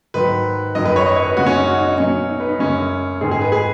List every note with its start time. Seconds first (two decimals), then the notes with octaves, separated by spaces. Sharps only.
0.14 G#2 D#3 F#3 B4
0.75 F#2 D#3 F#3 D#5
0.85 B4
0.96 C#5
1.06 D#5
1.16 C#5
1.26 B4
1.37 F#2 C#3 G#3 F#4
1.46 C#4
1.57 D#4
1.67 F#4
1.78 D#4
1.88 D#4
1.98 B2 F#3 C#4
2.29 D#4
2.40 B4
2.49 D#4
2.59 F#2 C#3 G#3 C#4
3.21 G#2 D#3 G#3 G#4
3.31 G#4
3.41 B4
3.52 G#4